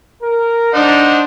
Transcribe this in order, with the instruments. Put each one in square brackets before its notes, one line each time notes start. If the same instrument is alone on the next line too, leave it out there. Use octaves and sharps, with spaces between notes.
[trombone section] A#4
[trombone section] D4 [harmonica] D#4 C5 F#5